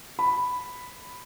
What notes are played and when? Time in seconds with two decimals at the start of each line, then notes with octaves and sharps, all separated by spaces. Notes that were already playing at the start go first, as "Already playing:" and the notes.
0.19 B5